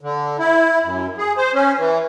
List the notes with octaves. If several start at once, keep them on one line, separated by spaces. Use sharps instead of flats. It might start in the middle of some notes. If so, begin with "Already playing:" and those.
D3
E4
F#2
G#4
C5
C#4
E3